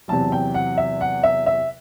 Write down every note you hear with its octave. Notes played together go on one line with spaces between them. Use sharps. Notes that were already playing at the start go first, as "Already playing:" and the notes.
E2 C3 F#3 A5
G5
F#5
E5
F#5
E5
E5